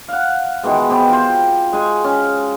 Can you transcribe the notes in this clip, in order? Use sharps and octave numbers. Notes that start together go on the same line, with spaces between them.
F5 F#5
B2 D#3 E3 G#3
B3 C4 G4
F4 C5
G#3 G#5 C#6
C#4